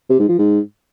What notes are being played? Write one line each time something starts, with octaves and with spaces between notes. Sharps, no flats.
C3
G#2
F3
G#2